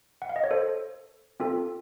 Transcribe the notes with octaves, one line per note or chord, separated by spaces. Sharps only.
F#5
F5
D#5
C#5
A4 C5
C4 F4 A4